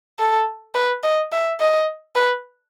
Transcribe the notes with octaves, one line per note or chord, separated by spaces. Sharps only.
A4
B4
D#5
E5
D#5
B4